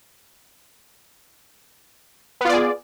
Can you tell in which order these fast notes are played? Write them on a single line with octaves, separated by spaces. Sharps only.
B3 F4 D5 G#4